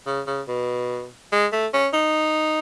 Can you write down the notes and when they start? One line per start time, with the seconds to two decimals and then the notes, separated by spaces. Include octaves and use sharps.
0.07 C#3
0.27 C#3
0.48 B2
1.32 G#3
1.52 A3
1.73 C#4
1.93 D#4